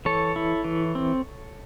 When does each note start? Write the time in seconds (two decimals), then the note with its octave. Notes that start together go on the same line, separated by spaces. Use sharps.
0.05 E3 A4 C#5
0.36 E4
0.64 E3
0.95 C4